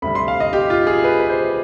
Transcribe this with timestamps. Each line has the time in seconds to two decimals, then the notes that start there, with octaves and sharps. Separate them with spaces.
0.02 D2 C3 G3 B5
0.15 C6
0.28 F5
0.40 D#5
0.53 G4
0.70 F4
0.87 G#4
1.04 B4
1.20 B4
1.29 C5